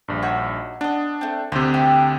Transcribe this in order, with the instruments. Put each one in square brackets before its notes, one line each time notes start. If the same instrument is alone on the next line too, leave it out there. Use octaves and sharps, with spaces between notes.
[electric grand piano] A#1 G2
[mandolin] D#4 F#4 C#5
[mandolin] B3 D#5 [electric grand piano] D4
[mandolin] A3 C4
[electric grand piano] D2 C3 [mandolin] C5
[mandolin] G4 E5